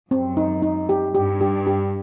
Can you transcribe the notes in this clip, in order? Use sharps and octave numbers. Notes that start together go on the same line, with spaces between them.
F#2 C4
D#4
D#4
G4
G2 G4
G4
G4